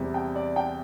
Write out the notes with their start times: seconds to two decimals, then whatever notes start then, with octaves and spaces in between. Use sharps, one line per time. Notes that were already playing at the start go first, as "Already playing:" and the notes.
Already playing: E2 C3 G3
0.14 G5
0.35 D5
0.56 G5